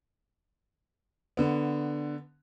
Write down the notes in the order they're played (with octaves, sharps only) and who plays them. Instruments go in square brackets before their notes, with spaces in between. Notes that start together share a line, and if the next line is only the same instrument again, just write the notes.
[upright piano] D3 B3